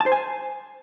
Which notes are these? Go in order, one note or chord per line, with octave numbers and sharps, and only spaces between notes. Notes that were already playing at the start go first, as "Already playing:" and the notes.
A5
C5
G#5